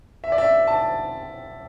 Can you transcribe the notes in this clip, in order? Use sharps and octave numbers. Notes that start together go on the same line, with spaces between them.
E5
D5
E5
A5